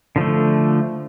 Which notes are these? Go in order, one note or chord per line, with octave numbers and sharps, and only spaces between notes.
D3 F3 A3